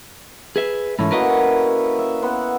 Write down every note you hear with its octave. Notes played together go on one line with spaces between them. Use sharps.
G#4 B4 E5
G#2 E3 A3 C#4 E4
A#3 F#4 A#4 B4 D#5
E5
B3 F#5 C6